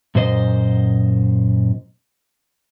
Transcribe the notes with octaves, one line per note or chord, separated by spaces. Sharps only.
F#2 A#2 C5 D#5